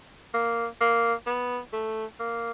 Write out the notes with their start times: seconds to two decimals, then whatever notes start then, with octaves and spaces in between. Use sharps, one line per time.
0.34 A#3
0.81 A#3
1.27 B3
1.73 A3
2.20 A#3